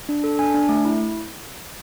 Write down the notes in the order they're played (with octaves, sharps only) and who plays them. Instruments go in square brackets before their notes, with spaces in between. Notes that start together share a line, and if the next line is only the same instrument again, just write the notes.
[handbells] D4
A4
D4 G#5
D4
A3
E4